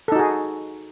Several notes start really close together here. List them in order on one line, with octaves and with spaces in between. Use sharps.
A4 D#4 F#4 G#4